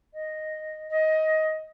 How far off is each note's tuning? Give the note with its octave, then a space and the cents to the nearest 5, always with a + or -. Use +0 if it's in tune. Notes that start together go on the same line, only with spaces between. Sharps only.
D#5 -5
D#5 +15